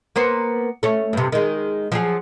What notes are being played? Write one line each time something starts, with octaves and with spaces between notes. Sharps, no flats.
A#3 B3 C5
A3 C#4
G2 C3
D#3 G#3
F3 F#3 G#4